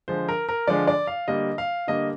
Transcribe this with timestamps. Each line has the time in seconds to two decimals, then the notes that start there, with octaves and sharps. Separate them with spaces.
0.08 D3 F3 G#3 C5
0.28 A#4
0.49 A#4
0.67 D3 F3 G#3 D5
0.87 D5
1.07 F5
1.28 D3 G3 A#3 D#5
1.58 F5
1.87 D3 G3 A#3 D#5